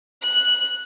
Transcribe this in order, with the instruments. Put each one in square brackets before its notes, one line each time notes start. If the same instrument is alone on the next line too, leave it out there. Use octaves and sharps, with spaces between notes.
[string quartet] F#6